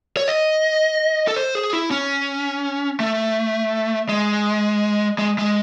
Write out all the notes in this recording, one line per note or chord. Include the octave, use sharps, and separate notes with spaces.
C#5
D#5
A4
C5
G#4
E4
C#4
A3
G#3
G#3
G#3